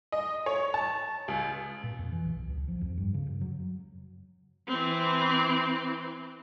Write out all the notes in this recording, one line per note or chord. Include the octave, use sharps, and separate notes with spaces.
D#5
C#5
A5
C#2
A#2
F2
E3
B1
C#2
F3
F2
G2
C#3
F#2
F#3
E3 C4